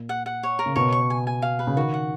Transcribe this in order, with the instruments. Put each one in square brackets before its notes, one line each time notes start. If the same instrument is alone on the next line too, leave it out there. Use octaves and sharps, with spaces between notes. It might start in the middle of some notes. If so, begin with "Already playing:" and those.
Already playing: [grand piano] A#2
[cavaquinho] F#5
F#5
C#5
A#4
[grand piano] C#3
[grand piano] B2 [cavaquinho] C#5
[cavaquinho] C#6
G#5
G#5
F5
B4
[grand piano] C#3
[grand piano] D#3 [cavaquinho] F#4
[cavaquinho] F#5